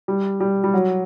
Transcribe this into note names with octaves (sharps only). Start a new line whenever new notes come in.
G3
G3
G3
F#3